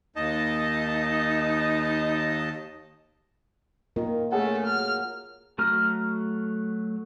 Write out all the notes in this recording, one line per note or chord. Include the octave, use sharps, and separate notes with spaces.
D#2 D#4 D#5 A5
D#3 A#3 F4 A#4
A3 C#4 G#4 A4 F#5
F#3 F6
F#3 A3 F#4 A#5 F6